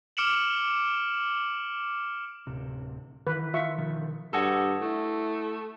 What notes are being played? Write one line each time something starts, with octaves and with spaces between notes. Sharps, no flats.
D6 F6 C#7 D7 E7 F#7
D1 C3
D#3 E3 B4
F4 E5 C#6
B2 D#3 F3
G2 F#4 G#4 A4
A3 E4